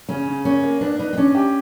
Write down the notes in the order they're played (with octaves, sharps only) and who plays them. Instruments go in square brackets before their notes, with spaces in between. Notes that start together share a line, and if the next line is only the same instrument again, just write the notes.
[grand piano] C#3 [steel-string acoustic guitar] C#4
[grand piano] C#3
[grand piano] A#3 [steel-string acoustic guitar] C#4
[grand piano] A#3
[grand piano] B3 [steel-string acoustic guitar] D4
[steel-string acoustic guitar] D#4 [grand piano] B4
[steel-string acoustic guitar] C4
[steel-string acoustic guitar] C#4 [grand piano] D4
[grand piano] G4